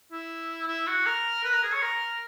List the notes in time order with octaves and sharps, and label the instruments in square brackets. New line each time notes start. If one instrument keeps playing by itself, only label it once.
[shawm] E4
E4
F#4
A#4
B4
A#4
G#4
C#5
A#4